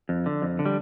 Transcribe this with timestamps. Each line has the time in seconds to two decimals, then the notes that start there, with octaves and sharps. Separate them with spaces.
0.09 F2
0.26 D3
0.42 F2
0.59 D3
0.66 G3